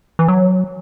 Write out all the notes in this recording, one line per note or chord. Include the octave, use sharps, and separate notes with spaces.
E3
F#3